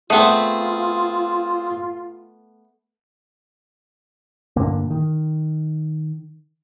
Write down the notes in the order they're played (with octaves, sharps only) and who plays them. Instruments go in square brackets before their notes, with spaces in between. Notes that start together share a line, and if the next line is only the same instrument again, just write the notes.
[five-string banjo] A3 B3 [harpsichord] C4 G#4 [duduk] F4
[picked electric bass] G2 A#2 D3 A#3
D#3